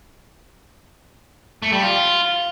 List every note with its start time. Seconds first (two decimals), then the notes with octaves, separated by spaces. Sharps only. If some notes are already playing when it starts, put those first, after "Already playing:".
1.63 A3
1.72 G3
1.82 F4